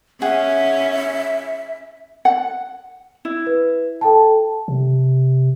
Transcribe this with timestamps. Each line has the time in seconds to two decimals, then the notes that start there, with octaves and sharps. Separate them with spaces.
0.22 C#4 G#4 E5 F#5
2.25 F#5
3.25 E4
3.47 B4
4.01 A4 G5 A5
4.68 C3